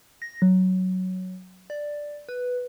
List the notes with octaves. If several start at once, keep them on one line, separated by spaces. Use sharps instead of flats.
A#6
F#3
D5
B4